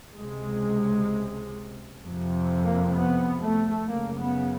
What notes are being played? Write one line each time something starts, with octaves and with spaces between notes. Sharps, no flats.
C#2 C3 G#3
F2 C3
A#3
B3
A3
F#2 C#3 A#3
B3